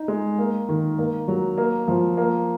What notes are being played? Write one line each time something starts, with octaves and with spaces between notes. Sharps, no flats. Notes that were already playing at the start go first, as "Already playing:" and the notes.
Already playing: D#4
G#3
A#3
D#3
A#3
F#3
A#3
F3
A#3